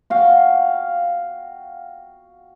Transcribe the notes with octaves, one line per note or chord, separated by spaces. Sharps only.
F#4 F5 G5